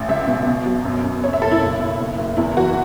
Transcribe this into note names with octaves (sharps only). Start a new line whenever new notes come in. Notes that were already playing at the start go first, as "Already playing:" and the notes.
Already playing: A1
C#2 E5
B2
B2
F#3
F#2
F#2
F#1 C#5
E5
F#1 A4
E4
B1
B1
F#1
F#1
E2 E4
E3 F#4